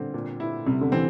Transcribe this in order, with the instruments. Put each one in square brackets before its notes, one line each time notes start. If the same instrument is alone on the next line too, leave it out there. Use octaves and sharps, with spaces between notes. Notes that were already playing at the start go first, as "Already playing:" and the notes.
Already playing: [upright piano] A#2 G3 C4 [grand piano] D3
[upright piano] A#2
E4
[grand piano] C3 [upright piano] G3
[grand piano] D3
[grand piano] E3 [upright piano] C4